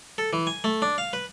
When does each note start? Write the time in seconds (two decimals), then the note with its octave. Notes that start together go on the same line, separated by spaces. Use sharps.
0.18 A4
0.33 E3
0.47 G#5
0.64 A3
0.82 D4
0.98 F5
1.13 B4